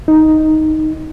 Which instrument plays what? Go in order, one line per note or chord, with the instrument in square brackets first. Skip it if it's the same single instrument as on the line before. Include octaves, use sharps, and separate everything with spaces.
[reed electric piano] D#4